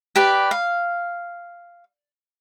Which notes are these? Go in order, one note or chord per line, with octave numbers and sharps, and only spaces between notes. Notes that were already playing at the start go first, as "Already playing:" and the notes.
G4 B4 D5
F5